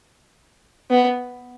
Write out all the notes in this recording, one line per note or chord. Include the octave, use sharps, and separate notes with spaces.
B3